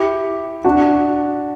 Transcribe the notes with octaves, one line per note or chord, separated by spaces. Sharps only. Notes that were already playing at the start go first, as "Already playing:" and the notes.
Already playing: E4 G4
D4 F#4